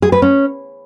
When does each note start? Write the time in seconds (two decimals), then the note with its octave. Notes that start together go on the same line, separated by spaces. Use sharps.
0.02 G#4
0.12 B4
0.22 C#4